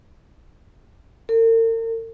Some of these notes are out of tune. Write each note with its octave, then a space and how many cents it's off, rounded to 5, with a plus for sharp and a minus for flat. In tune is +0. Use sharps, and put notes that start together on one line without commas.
A#4 -45